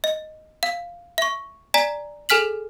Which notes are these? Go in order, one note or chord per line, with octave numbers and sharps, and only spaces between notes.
D#5
F5
E5 C#6
D5 G#5 A#5 B6
G#4 A4 G#5 F6 B6 F#7